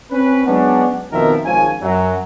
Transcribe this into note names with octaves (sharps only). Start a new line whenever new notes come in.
C4 C#4 B4
F#3 G#3 B3 C#4 D4
F2 B2 D#3 F3 A#4 E5
G#1 G#2 F3 C#4 G#5
F#2 F#3